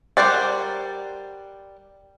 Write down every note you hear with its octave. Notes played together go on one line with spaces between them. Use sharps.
G3 A#4 C5 D5 F#5